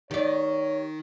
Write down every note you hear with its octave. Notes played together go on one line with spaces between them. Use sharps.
D#3 G4 C#5 D5